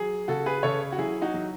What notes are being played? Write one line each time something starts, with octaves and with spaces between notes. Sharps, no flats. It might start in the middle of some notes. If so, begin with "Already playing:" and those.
Already playing: F#3 G#4
C#3 F#4 A4
G#4 B4
C#3 A4 C#5
F#4
F#3 E4 G#4
D#4 F#4
F#3